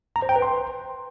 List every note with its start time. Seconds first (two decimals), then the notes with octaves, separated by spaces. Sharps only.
0.16 A#5
0.22 C5
0.29 G5
0.36 B4
0.42 C6